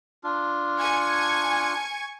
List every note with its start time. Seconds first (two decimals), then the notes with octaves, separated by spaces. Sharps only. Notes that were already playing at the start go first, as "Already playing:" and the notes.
0.24 D4 F4
0.79 G#5 C#6 G#6